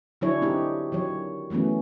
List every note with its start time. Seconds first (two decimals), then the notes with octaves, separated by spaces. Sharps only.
0.21 D3 F#3 D4 E4 G#4 C#5
0.42 C4 D#4 G4
0.92 D#3 F#3 C#5
1.50 E3 F#3 A3 B3 C#4